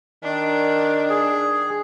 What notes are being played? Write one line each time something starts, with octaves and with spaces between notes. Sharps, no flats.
D#3 D4
G#4